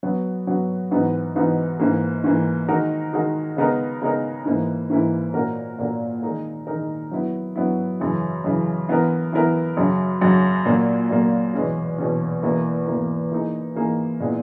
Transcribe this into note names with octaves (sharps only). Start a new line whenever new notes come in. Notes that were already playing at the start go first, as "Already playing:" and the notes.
F#3 B3 F#4
F#3 B3 F#4
G#2 E3 B3 D#4 F#4
G#2 E3 B3 D#4 F#4
G#2 E3 A#3
G#2 E3 A#3
D#3 G#3 D#4 F#4 A#4
D#3 G#3 D#4 F#4 A#4
C#3 G#3 B3 D#4 A#4
C#3 G#3 B3 D#4 A#4
G#2 E3 A#3 E4
G#2 E3 A#3 E4
A#2 A#3 C#4 F#4 A#4
A#2 A#3 C#4 F#4 A#4
D#3 G#3 D#4 A#4
D#3 G#3 D#4 A#4
F#3 B3 E4
F#3 B3 E4
F#2 C#3 E3
F#2 C#3 E3
E3 B3 E4 A#4
E3 B3 E4 A#4
F#2 C#3 F#3
F#2 C#3 F#3
A#2 F#3 A#3
A#2 F#3 A#3
E2 B2 G#3 C#4
E2 B2 G#3 C#4
E2 B2 A#3 E4
E2 B2 A#3 E4
E3 A#3 D#4 G#4
E3 A#3 D#4 G#4
A#2 G#3 B3 E4